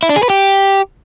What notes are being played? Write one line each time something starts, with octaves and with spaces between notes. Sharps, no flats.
E4
D4
G#4
B4
G4